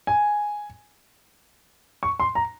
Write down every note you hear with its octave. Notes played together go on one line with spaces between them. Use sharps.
G#5
C#6
C6
A#5